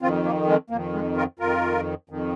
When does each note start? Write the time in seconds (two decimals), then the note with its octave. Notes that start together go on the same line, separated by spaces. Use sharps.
0.02 F2 D#3 C4 F4
0.25 A#3
0.48 G#3
0.70 F2 D#3 A#3
0.93 G#3
1.17 F4 A#4
1.39 F2 D#3 F4 A#4
2.10 F2 D#3